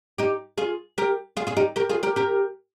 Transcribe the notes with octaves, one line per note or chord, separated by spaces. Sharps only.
D#4 G4
F4 G#4
G4 A#4
F4 G#4
F4 G#4
D#4 G4
G4 A#4
F4 G#4
G4 A#4
G4 A#4